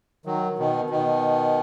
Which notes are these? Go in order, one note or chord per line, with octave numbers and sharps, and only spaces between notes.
D#3 F#3
B2 D#3
B2 D#3